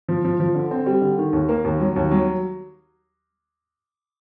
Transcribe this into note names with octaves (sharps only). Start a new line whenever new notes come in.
F3
F3
F3
D3
C4
G3
D3
D#3
D#2
A#3
D#2
F#3
D#2
F#3